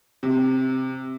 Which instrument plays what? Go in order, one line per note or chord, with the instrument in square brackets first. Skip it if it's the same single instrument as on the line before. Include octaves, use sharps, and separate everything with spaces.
[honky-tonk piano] C3